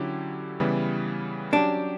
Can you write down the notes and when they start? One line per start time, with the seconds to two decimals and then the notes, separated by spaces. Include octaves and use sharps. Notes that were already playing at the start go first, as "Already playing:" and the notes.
Already playing: D3 F#3 C#4 E4 G4
0.60 C#3 E3 G3 B3 E4
1.53 F#3 C#4 D4 G4